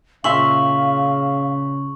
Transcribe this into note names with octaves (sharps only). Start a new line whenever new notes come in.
A#2 C#3 E5 F5 C6 C#6 F#7